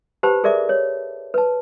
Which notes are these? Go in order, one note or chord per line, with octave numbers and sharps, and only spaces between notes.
G4 B4 C5 A5 B5
G#4 A#4 D5 E5 D6
C#5
B4 A5